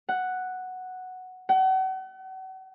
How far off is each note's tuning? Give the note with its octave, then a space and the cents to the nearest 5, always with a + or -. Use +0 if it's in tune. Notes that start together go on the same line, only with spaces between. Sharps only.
F#5 +0
F#5 +40